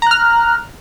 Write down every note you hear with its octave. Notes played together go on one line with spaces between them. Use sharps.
A#5 F6 F#6